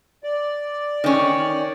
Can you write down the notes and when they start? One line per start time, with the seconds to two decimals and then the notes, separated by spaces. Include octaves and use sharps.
0.24 D5
1.04 D#3 C#4